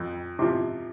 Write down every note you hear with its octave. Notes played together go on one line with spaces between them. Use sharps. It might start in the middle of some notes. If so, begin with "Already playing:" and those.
Already playing: F2
C3 F3